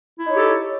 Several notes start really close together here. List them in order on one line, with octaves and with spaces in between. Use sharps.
E4 D#4 C#5 G4 A4